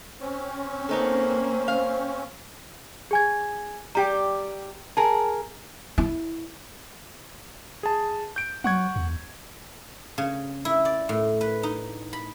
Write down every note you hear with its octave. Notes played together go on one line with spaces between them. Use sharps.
C4 C#4
A#3 B3 D#4 A4 C5
F5
G#4 G#5 G#6
G3 G4 G5 A#5
G#4 A#4 A5
E4
G#4 A5
G6 D7
F#3 F#5 C#6 G#6
E2
C#3
E4
D5
A2
B4
D#4
B5